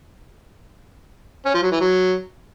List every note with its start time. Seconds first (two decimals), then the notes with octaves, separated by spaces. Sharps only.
1.46 C#4
1.54 F3
1.63 F#3
1.72 E3
1.81 F#3